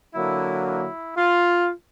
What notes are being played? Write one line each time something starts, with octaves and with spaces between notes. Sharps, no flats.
D3 F#3 A#3 E4
E4
F4